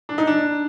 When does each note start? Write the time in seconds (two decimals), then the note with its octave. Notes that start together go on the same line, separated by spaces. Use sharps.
0.09 D4
0.18 D#4
0.27 D4